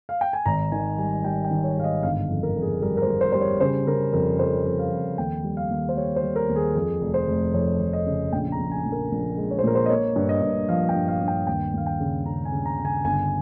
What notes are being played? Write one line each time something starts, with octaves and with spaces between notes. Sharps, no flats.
F5
G5
G#5
G#1 A#5
D#3 G#5
G3 G#5
G3 G5
G5
D#3
C#5
G#2 F5
D#5
G1 F5
F2
A#4
F2
G#4
G3 A#4
A#4
C5
G3
C5
G3 C5
C#5
C#3 C5
C#3 A#4
F2 A#4
F2 C5
F2
F5
F2
D#2 G5
G3
F5
D#2
C5
G3 C#5
C5
G3
A#4
D#2
G#4
F2 G#4
F1
C5
F1
F2 C#5
F1
D#5
C#3
A#1 G5
A#5
A#1
G#5
A#1
A#4
A#1
G#3
C#5
C5
A#2 A#4
C5
D#5
A#3 C#5
G2
D#5
G2
F3 F5
G5
G2
F5
G2
G5
D#2 G5
D#2 F5
G5
C#3
C#3 A#5
G#5
C#3
A#5
C#3
G#5
G1 G#5